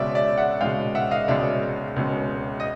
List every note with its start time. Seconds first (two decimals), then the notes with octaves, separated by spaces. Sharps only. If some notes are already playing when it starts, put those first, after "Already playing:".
Already playing: C#2 B2 G#3 C#4 D5 E5
0.15 D5 E5
0.38 E5 F#5
0.61 C#2 B2 G#3 C#4 F5 G5
0.95 E5 F#5
1.11 D#5 F5
1.28 C#2 B2 G#3 C#4 D5 E5
1.96 C#2 B2 G#3 C#4
2.60 D#5